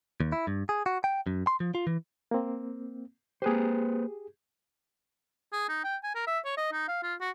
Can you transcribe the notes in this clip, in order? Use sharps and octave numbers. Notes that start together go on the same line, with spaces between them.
D#2
E4
G2
G#4
F#4
G5
F#2
C6
F3
F4
E3
A#3 C4
A#3 G4 G#4 B4 C5
G#4
D#4
G5
G#5
A#4
E5
C#5
D#5
D#4
F5
F4
F#4